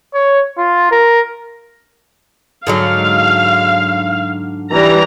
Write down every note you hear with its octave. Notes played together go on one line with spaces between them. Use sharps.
C#5
F4
A#4
G#2 D3 F#3 F5
E3 G3 A#5